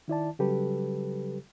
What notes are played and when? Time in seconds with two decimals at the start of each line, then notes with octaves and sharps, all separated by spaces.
0.08 D#3 E4 D5 A5
0.39 C#3 F#3 G3 G4 A4 B4